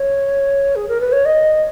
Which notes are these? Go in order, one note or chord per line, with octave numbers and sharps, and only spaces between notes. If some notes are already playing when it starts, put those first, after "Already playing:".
Already playing: C#5
G#4
A#4
B4
C#5
D#5